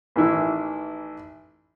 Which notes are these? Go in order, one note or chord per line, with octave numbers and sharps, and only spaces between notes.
A1 D#3 E3 E4